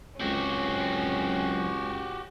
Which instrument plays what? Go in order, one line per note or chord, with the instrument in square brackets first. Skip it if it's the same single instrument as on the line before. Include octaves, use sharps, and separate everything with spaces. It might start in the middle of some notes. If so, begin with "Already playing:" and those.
[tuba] C#2 [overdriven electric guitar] F#3 C4 [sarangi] C#4 [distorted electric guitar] F#4 G4